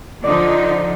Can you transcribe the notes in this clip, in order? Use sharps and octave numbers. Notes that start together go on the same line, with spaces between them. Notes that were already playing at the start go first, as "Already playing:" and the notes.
D3 F3 D#4 D5